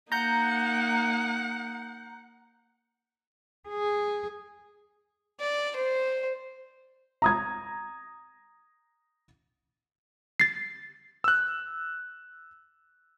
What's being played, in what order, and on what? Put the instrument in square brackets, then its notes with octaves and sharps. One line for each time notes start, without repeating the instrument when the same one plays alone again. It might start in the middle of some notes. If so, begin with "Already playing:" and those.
[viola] A#3 D#4 [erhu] F#5 [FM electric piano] A#5 G6
[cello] G#4
[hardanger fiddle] D5
C5
[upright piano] A#5 D#6 G#6
[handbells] A6 C7
[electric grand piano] E6 F#6